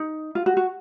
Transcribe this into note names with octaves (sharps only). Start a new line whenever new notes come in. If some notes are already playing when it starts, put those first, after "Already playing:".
Already playing: D#4
F4
F#4
F#4